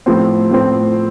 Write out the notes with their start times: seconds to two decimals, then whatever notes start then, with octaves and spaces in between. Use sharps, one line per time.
0.06 A2 F3 C4
0.51 A2 F3 C4